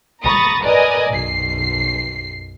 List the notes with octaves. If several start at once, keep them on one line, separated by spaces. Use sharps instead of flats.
A#5 B5 C#6 D#6 A6
A#4 B4 D5 D#5 G#5 D#6
B1 F#2 C7